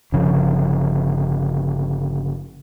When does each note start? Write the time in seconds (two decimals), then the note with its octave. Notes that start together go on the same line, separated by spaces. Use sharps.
0.12 G1 C#3 F3